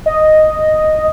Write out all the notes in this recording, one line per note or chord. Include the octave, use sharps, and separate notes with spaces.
D#5